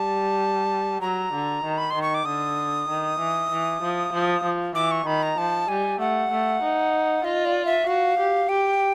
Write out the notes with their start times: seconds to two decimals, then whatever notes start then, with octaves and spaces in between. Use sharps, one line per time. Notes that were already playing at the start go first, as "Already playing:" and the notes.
Already playing: G3 A5
1.01 F#3 A#5
1.33 D3
1.64 D#3
1.78 B5
1.90 D#3 C6
2.02 C#6
2.14 D6
2.25 D3 D#6
2.88 D#3
3.19 E3
3.51 E3
3.82 F3
4.13 F3
4.44 F3
4.75 E3 D6
4.91 C#6
5.06 D#3 B5
5.23 A#5
5.38 F3 A5
5.68 G3 G#5
6.00 A3 F#5
6.31 A3
6.62 D#4
7.24 F4 D#5
7.45 D5
7.66 E5
7.86 F#4 F5
8.19 G4
8.49 G4 G5